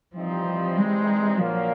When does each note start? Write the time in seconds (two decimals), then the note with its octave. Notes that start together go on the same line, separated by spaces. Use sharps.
0.16 C3 E3 F3 G3 C4 D#4
0.78 G#3
1.38 A#2 F3 F#3 A#3 D4